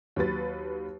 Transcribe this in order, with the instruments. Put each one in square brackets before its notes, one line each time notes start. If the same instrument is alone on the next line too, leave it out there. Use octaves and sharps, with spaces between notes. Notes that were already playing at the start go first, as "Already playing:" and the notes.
[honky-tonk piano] D#2 F#3 B4 A6